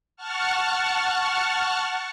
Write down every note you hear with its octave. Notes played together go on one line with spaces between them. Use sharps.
F#5 A5 C#6 F6